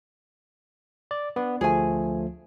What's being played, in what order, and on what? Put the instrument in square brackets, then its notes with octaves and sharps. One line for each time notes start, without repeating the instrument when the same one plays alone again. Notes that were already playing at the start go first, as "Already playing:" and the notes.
[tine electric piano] D5
[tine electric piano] B3 [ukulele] D4
[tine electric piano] D2 F3 A3 [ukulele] G#4 G#5